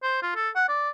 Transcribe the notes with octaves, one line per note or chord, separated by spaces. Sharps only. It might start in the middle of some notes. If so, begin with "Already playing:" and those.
C5
F4
A4
F#5
D5